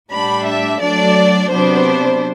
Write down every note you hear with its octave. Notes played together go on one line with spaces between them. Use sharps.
A2 G3 D4 B5
E5
F#3 A3 D4 D5
C3 F#3 B3 D4 C5